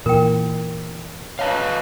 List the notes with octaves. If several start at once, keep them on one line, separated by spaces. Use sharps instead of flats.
A#2 E3 A#4 G5
B4 C#5 D#5 F5 A5